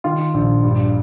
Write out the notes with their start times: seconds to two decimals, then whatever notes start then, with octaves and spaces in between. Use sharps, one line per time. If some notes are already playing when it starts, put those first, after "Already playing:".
0.04 D#3 F4
0.34 A#1
0.63 G2